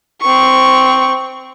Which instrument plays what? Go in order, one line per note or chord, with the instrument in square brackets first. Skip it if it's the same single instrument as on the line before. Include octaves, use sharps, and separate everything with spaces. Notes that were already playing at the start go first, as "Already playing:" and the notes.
[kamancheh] C4 C#6